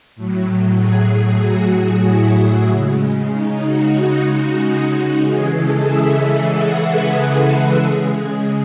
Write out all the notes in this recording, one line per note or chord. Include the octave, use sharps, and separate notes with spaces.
A2 F#3
G#4
F#4
E4
E4
C#3 G#3
D#4
F#4
C#3 E3 G#3 G#4
A4
E5
E5
F#5
B4
A4
C#3 G#3 G#4